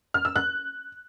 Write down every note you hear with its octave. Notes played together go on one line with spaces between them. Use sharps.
F6
E6
F#6